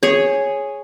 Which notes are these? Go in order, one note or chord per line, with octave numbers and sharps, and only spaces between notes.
G#4 C#5